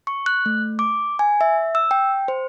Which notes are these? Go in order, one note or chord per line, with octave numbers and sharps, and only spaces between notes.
C#6
F#6
A3
D6
G#5
E5
E6
G5
C5